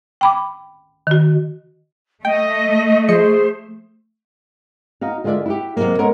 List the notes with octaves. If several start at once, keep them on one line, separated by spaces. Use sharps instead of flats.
G5 B5 D6
D#3 F#4
A3 D#5 G5
F3 G#4 C5 D#5 C#7
D#4 F#4 F5
D3 G#3 F4 B4 D5 E5
E4 F#4 G4
C3 F3 F#3 G#3 A#3
G#3 B3 C#4 A4 A#4 F#5